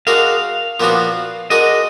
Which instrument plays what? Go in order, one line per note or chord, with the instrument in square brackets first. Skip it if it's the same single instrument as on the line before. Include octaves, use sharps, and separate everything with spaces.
[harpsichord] G#3 D4 F#4 A#4 [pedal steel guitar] F5
[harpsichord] A#2 F3 B3 D4 F#4
[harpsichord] G#3 D4 F#4 A#4 [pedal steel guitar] D#5